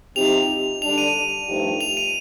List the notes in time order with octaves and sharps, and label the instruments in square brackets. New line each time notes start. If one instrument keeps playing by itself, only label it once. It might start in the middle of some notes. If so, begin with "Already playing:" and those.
[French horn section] C3 F3 C4 D#4 G4 [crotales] F7
[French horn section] D3 G3 D4 [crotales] F7
[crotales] D#7
[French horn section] G2 F3 A3 D#4 G4
[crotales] F7
D#7